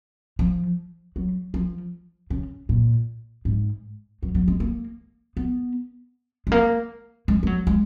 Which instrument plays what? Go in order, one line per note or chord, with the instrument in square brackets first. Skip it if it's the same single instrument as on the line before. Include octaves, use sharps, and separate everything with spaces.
[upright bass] F3
F#3
F3
C#3
A#2
G#2
F#3
F#3
G#3
A#3
B3
G#3
A#3
G#3
G#3
F#3
G#3